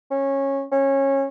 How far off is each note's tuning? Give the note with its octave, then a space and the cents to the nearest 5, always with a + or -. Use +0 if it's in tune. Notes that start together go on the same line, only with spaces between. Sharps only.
C#4 -15
C#4 -20